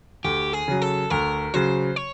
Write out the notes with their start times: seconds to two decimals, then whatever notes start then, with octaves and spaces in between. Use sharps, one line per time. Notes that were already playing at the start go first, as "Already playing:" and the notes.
0.24 D2 G4
0.53 G#4
0.68 C#3 F#3
0.82 A4
1.10 D2 A#4
1.54 C#3 F#3 C5
1.96 C#5